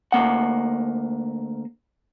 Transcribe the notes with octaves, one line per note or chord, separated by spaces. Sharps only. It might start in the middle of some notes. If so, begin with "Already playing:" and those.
D2 A#3 F#5